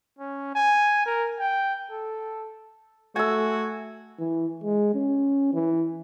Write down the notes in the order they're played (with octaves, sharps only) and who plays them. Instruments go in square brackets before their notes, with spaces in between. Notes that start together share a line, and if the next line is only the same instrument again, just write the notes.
[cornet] C#4
G#5
A#4
G5
A4
[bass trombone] A3 [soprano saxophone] F#4 [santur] G#5 E6
[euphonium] E3
G#3
C#4
E3